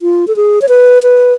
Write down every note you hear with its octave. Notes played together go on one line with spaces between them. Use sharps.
F4
A4
G#4
C#5
B4
B4